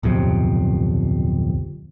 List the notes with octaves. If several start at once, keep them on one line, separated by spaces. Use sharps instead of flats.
D1 B1 F2 C3